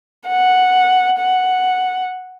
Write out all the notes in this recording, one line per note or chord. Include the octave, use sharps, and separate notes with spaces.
F#5
F#5